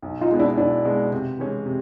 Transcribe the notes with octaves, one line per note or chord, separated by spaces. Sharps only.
B1
D#4 F4
B2 G#3
D4 E4
B1 D4 E4
B2 G#3
C3
E3 G#3 C#4
C3